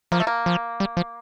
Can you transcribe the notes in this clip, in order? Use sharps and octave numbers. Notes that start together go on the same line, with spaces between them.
F3 A#3
A3
A#3
F3
G3
F3